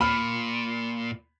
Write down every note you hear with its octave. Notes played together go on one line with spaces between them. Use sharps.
A#2 B5 F6